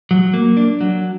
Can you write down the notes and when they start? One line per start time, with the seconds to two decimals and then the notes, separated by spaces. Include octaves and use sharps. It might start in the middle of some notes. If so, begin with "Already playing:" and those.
0.11 F#3
0.33 A#3
0.57 D4
0.81 F#3